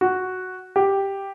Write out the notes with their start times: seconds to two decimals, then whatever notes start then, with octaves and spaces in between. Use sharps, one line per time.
0.01 F#4
0.76 G4